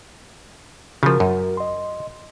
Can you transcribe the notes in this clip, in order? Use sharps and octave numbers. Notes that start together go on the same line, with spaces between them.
C#3 F3 F#4 A#4
F#2
D#5 C6